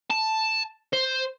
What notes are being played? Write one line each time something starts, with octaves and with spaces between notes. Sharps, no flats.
A5
C5